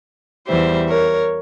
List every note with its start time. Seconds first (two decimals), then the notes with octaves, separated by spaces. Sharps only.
0.47 E2 E3 G3 C5 E5
0.88 A#4 C#5